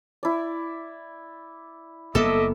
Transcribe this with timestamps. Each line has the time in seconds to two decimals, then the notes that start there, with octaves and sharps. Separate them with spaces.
0.23 E4 D5
2.15 F#1 A#3 B3 A4 D#5 E5 D6